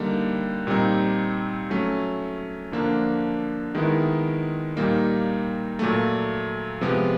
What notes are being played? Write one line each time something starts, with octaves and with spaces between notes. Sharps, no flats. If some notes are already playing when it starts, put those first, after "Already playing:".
Already playing: D3 G3 A#3 D#4
A#2 G3 C4 D#4
F#3 A3 C#4
D3 F3 A#3 D4
D#3 G#3 B3 E4
A#2 G3 A#3 D#4
A#2 F#3 A3
C3 F3 G#3 B3